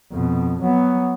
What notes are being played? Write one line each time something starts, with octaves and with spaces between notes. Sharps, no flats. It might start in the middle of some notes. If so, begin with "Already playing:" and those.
F2 B2
F#3 B3